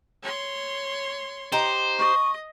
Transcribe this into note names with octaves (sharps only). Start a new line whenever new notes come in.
C#5 C6
D#4 G4 C5
D#5 C#6